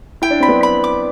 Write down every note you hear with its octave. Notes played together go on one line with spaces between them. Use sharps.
E4 G5
D4
C4 B5
B3 D4
B5
D6